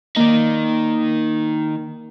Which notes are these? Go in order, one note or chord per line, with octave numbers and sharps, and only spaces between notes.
D#3 A#3 D#4 D5